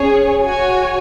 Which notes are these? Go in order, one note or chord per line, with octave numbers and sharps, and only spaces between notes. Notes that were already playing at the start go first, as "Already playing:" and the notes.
Already playing: C#4 G#4 C#5
F#4 C#5 G#5